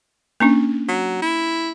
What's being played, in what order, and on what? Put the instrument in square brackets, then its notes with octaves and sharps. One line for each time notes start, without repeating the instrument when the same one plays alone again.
[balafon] A#3 C#4 D4
[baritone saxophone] F#3
E4